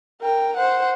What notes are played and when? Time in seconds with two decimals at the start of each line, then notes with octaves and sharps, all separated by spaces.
0.21 A#4 G5
0.57 C5 F#5